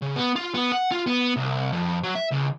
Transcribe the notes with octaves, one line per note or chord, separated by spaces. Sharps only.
C#3
B3
F4
B3
F#5
F4
B3
C2
F2
F#3
E5
C#2